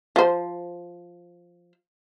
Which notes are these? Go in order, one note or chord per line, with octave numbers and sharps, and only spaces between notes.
F3 C5